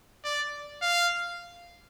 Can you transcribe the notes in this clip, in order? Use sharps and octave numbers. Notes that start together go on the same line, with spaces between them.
D5
F5